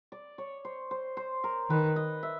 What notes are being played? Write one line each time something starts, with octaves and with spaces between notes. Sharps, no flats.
D5
C#5
C5
C5
C5
A#4
D#3 B4
D#5
E5